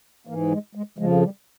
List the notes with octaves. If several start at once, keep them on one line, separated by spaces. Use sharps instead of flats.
G#2 E3 A#3
G#3
G#3
F2 C#3 F3 G#3
G3